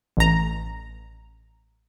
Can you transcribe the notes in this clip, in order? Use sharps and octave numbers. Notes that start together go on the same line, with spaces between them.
A1 A#5